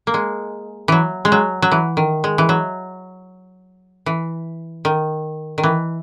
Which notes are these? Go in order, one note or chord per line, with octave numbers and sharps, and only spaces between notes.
A#3
G#3
E3 F#3
G#3
F#3
F#3
E3
D#3
G#3
E3
F#3
E3
D#3
D#3
E3